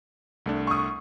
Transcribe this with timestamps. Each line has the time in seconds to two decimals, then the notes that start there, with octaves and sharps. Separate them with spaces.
0.46 C2 A3 D4
0.67 C#6 D#6